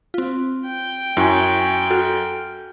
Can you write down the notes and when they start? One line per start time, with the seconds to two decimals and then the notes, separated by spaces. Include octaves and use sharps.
0.14 C4 F4
0.66 G5
1.17 F#2 E4 G#5 C#6
1.90 F#4 A4 F6